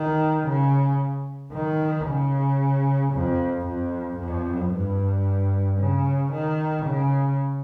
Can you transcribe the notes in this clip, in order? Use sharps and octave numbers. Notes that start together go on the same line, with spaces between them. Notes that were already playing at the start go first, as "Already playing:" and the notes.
Already playing: D#3
C#3
D#3
C#3
F2
F2
F2
G2
C#3
D#3
C#3